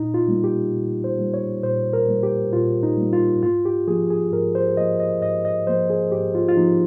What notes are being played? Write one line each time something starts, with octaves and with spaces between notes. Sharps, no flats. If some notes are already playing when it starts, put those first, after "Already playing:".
Already playing: A#2 D#4
F4
G3 A#3
G4
A#2
C5
G3 A#3
C#5
A#2 C5
A#4
G3 A#3
G4
A#2 F4
D#4
G3 A#3
F4
G#2 F4
G4
F3 A#3 G#4
G#4
G#2 A#4
C5
F3 A#3 D#5
D#5
G#2 D#5
D#5
F3 A#3 C5
G#4
G#2 G4
F4
F4
F3 A#3 D#4